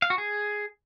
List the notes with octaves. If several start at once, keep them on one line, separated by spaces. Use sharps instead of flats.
F5
F#4
G#4